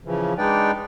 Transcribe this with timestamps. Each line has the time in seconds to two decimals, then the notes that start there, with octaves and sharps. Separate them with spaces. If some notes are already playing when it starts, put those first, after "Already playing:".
0.05 C#3 E3 F3
0.38 G#3 D4 D#4 B4 D5 G5